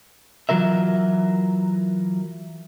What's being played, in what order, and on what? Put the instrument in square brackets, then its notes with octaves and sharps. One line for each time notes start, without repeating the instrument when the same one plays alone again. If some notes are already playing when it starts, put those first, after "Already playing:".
[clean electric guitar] E3 F#3 F4 A#4 E5